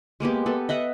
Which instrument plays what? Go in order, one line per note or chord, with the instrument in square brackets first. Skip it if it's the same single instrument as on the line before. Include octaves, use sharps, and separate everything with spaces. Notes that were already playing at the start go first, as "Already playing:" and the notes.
[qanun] G#3 A#3 B3 G4
B3 A4
D#5 E5 F#5